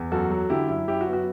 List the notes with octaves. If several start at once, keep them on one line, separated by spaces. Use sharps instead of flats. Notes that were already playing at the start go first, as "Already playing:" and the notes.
Already playing: E2
F#2 F#4 A4
F#3
D3 E4 G4
F#2 E4
F#2 E4 G4
F#4
B3
F#4